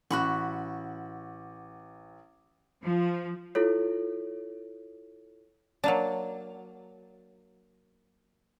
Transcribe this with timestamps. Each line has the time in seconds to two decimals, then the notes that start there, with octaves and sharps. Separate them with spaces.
0.11 A1 F#4 B5 C#6
2.83 F3
3.55 E4 F4 A4 C#5
5.84 F#3 A#3 D4